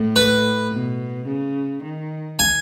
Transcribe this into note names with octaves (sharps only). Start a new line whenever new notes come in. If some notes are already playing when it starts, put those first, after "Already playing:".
Already playing: A2
B4
B2
C#3
D#3
G#5